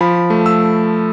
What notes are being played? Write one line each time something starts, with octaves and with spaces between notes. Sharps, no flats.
F3 B5
A3
E6